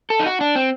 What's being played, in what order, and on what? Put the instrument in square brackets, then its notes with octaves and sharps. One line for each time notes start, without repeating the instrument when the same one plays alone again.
[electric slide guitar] A4
D#4
F#4
D4
C4